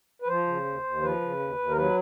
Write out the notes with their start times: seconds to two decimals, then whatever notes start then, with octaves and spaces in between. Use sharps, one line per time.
0.22 B4
0.28 F3 C5
0.47 C#3
0.65 D#2
0.83 D#2
1.02 F3 B4
1.21 C#3
1.39 D#2
1.58 D#2
1.69 A#4
1.76 F#3 B4